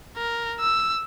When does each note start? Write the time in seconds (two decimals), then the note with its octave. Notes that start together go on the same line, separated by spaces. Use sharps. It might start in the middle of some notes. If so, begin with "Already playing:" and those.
0.17 A#4
0.60 E6